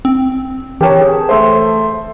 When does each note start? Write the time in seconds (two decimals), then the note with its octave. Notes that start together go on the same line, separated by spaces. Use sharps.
0.05 C4
0.81 E3 G4 A#4 C#5 A5
1.00 G#4
1.29 A3 C5